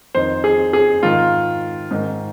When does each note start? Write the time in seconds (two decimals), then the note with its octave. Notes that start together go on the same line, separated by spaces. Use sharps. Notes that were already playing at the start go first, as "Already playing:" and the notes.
0.15 F2 D#3 C5
0.44 G#4
0.73 G#4
1.03 G#2 D#3 F4
1.91 G#2 D#3